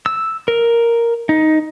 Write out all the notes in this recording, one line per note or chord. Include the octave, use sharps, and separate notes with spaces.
E6
A#4
D#4